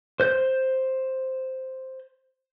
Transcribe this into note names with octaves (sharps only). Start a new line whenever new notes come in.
C5 G6